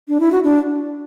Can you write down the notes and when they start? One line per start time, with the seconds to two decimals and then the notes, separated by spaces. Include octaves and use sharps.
0.08 D4
0.20 E4
0.32 F#4
0.44 D4